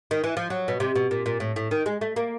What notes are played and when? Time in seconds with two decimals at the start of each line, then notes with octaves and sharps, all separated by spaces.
0.11 D#3
0.24 E3
0.37 F3
0.50 F#3
0.68 B2
0.80 C3
0.95 B2
1.11 A#2
1.26 A#2
1.40 A2
1.56 A2
1.71 D#3
1.86 G#3
2.01 A3
2.16 A#3